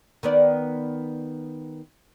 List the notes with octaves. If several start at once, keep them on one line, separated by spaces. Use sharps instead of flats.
D#3 B3 D5